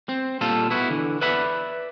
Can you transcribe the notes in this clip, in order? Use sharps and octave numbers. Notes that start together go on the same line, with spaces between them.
C4
A#2 G3 F4 A4
B3 E4 F#4
D3 E3
B4 D5 E5 F#5 B5